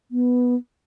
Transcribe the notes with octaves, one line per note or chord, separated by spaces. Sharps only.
B3